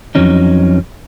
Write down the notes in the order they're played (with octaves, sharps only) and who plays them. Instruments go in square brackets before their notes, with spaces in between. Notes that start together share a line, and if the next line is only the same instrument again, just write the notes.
[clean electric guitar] F2 E3 F#3 C#4 D#4